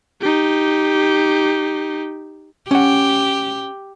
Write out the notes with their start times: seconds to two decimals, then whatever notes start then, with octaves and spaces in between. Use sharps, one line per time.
0.21 D#4 G4
2.71 C#4 G4 F#5